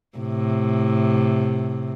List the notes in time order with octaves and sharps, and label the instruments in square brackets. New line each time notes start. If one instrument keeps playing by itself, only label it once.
[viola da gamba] A2 C3